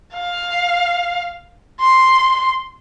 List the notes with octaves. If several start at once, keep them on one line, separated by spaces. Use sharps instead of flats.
F5
C6